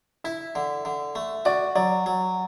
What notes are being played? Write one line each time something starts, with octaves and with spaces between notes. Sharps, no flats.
E4 E5
D3
D3
A3
F#4 D5
F#3 D5
F#3